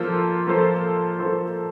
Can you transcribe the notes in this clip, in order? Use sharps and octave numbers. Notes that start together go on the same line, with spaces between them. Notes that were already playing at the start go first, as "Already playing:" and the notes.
Already playing: F3 A#3 F4 A4 C5
F3 A#3 F4 A4 C5
F3 A#3 F4 A4 C5